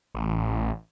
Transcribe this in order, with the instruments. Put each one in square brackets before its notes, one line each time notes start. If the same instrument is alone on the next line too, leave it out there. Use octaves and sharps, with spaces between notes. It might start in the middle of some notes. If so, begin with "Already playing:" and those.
[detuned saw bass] A1